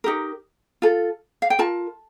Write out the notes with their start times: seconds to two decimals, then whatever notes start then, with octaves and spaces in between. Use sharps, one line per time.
0.04 D#4 G4 A#4
0.82 F4 A4
1.42 F5
1.50 G5
1.59 F4 A#4 A5